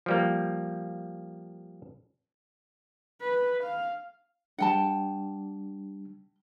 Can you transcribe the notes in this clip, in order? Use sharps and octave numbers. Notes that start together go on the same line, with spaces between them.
F3 G3 A#3
B4
F5
G3 D4 F#5 G5 A5